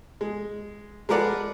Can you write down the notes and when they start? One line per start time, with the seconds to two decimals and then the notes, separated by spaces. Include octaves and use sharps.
0.21 G#3
1.09 G#3 A3 A#4 B4 D5 F#5